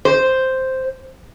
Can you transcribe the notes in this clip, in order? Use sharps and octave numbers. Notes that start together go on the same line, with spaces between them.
C5